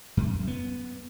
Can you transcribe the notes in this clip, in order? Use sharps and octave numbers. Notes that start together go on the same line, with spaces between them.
F#2
B3